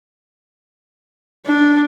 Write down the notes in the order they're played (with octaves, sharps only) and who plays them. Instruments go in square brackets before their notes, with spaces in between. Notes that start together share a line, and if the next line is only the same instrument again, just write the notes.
[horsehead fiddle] D4